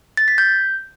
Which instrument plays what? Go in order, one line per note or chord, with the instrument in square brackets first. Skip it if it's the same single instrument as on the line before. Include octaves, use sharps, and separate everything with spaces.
[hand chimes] A6
B6
G6